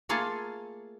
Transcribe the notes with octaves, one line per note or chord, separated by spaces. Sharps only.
A3 A#3 F4 G#4 A4